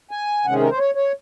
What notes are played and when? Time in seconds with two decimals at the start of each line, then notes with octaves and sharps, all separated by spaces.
0.11 G#5
0.45 C3 D#3 G#3 C#4 F#5
0.53 G#4
0.61 A#4
0.70 C5
0.78 C#5
0.95 C#5